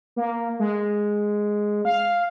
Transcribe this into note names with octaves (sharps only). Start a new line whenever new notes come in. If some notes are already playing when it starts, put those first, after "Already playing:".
A#3
G#3
F5